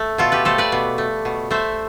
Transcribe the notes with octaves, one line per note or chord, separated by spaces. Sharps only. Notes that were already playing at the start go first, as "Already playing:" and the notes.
Already playing: A3
B2 F4 A4
G4 B4
A3 A4 C5
B4 D5
B2
A3
B2
A3 C5 E5